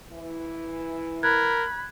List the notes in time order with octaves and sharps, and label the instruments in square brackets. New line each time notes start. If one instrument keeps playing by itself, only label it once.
[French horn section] E3 E4
[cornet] A#4 [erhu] B5 [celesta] F#6 G#6